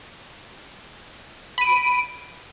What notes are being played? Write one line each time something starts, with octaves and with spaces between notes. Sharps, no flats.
B5 D7 D#7